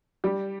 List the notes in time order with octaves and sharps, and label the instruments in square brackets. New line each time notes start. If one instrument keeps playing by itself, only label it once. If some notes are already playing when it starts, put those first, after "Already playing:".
[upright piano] G3 G4